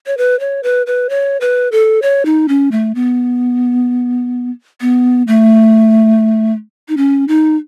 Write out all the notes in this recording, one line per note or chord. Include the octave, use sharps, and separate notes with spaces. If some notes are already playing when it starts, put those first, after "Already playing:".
C#5
B4
C#5
B4
B4
C#5
B4
A4
C#5
D#4
C#4
A3
B3
B3
A3
D#4
C#4
D#4